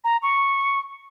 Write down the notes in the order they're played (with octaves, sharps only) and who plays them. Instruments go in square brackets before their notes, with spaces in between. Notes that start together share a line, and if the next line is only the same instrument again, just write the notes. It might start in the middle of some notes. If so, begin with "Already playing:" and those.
[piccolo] A#5
C#6